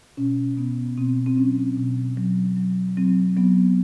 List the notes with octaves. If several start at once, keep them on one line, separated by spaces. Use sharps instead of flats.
B2 C#4
B2 B3
B2 C4
C4
F#3 C#4
B2
F#3
F#3
F#3 C4
F#3 B3